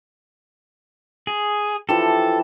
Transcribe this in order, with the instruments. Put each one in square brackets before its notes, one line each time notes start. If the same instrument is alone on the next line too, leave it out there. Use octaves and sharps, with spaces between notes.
[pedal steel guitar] G#4
[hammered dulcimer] E3 F3 G4 [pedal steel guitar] A4